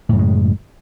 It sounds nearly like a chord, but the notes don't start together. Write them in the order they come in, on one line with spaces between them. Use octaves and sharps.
A2 F#2 C#3 G#3